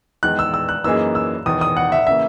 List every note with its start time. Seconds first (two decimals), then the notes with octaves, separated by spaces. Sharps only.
0.23 E2 D#3 G#3 F#6
0.39 E6
0.54 E6
0.69 F#6
0.84 F#2 E3 A#3 D#4 G#4 E6
1.15 E6
1.46 E1 E2 D#3 D#6
1.61 D#6
1.77 F#5
1.92 E5
2.07 C#3 E3 A#3 E5